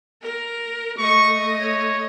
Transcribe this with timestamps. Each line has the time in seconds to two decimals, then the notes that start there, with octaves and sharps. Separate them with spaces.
0.22 A#4
0.98 A3 D#5 C#6
1.61 C#5